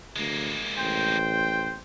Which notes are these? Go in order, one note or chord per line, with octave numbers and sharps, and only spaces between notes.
D2 G#3 A#3
A1 C5 G5